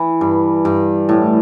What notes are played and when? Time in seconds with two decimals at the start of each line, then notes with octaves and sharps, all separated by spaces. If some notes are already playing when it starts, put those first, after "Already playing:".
Already playing: E3
0.21 G2
0.65 G2
1.09 A2